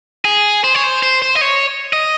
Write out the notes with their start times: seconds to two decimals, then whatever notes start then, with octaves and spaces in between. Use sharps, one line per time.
0.25 G#4
0.64 C5
0.75 C#5
0.83 C5
1.03 C5
1.22 C5
1.35 D#5
1.41 C#5
1.93 D#5